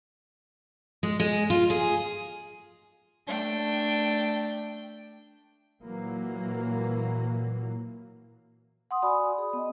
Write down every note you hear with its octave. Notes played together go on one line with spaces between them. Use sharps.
G#3
G#3
F4
G#4
A3 D4 G5
A#2 E3 F#3 A#3
F#5 C6 D#6
F#4 D5 G#5 B5 D#6
G#4
B3 D#5